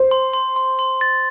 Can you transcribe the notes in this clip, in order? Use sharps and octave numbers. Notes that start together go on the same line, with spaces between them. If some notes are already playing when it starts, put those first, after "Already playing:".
Already playing: C5
C6
C6
C6
C6
A6